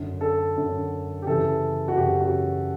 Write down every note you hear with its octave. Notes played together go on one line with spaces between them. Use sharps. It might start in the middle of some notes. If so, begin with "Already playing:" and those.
Already playing: F#2 D3
A4
F#2 D3
G4
F#2 C#3 E3 A4
F#4
F#2 C#3 E3 G4
F#4